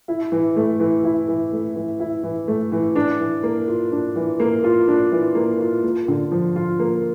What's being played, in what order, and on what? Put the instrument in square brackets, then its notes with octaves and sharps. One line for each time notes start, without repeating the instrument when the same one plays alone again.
[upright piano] E4
E3
A3
E3
E4
E3
A3
E3
E4
E3
A3
E3
D4
E3
A#3
F4
D4
E3
A#3
F4
D4
E3
A#3
F4
A#3
D3
F3
F4
A#3